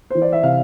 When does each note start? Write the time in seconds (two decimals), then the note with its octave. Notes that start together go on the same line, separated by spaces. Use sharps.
0.10 E3 C5
0.22 D5
0.32 E5
0.43 C3 F5